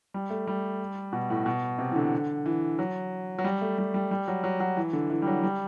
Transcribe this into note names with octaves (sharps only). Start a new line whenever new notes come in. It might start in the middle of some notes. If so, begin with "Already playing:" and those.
G3
A3
G3
B2
A2
B2
C3
E3
D3
E3
F#3
F#3
G3
A3
G3
G3
G3
F#3
F#3
F#3
E3
D3
E3
G3
F#3
G3